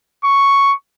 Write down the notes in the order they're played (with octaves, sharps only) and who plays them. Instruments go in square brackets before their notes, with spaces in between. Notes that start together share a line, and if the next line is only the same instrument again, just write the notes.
[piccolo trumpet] C#6